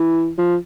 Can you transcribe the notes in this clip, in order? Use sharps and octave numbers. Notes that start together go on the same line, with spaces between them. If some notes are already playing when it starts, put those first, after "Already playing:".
Already playing: E3
F3